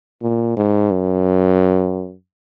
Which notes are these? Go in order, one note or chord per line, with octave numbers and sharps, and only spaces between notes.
A#2
G#2
F#2